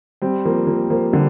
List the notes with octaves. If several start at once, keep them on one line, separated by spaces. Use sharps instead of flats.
G3 C4
F3 A#3
F3 A#3
F3 A#3
D3 G3